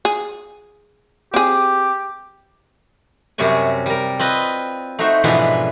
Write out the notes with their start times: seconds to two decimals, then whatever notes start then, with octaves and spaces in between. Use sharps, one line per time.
0.05 G#4
1.34 C4 G4 G#4
3.38 F#2 C3 G3 C#5 G#5
3.86 G3 A#4
4.19 C4 F4 B4 D#5
4.99 A3 D#4 F#4 C5 E5
5.24 G#2 B2 E3 F3 D4 E4